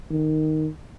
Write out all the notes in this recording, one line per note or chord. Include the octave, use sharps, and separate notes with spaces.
D#3